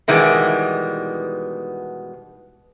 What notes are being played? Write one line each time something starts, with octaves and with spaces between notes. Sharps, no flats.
B2 D#3 E3 G3 G#3 B3